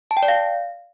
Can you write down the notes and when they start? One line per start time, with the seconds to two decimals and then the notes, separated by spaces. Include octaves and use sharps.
0.11 A5
0.17 G5
0.23 D5
0.28 F5